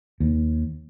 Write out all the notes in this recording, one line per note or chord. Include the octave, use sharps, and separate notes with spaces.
D#2